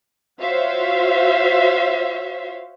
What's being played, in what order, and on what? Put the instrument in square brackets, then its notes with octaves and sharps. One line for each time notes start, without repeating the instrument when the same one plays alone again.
[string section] F4 F#4 C5 C#5 E5 F5